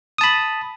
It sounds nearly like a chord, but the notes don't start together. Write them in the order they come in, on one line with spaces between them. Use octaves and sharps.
D#6 A5 B5